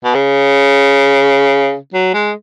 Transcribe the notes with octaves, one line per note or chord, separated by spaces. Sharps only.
B2
C#3
F#3
G#3